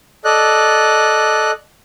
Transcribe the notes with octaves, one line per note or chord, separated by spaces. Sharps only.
A4 D5 D#5 F#6